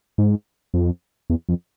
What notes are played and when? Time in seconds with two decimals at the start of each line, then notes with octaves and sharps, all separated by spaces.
0.18 G#2
0.74 F2
1.30 E2
1.49 F2